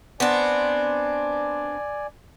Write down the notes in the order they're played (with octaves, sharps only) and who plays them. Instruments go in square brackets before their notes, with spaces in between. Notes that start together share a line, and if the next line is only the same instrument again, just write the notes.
[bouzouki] B3 C4 D4 [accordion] D5 G#5